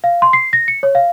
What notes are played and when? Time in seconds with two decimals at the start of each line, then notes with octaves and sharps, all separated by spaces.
0.04 F5
0.22 C6
0.33 C7
0.53 A#6
0.68 C#7
0.83 C#5
0.95 F5